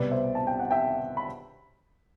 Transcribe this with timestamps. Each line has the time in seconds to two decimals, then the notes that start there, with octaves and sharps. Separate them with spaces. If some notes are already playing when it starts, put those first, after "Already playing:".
Already playing: C2 B2 B4 D5
0.11 C5 E5
0.35 A5
0.47 G5
0.59 F#5
0.71 E5 G5
1.17 B5